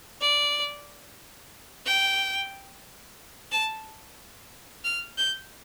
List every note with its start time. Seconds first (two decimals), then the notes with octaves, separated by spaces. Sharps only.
0.21 D5
1.86 G5
3.52 A5
4.84 F6
5.17 G6